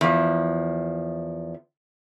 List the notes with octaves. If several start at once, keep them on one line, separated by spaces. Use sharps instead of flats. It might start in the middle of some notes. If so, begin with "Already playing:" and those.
E2 F3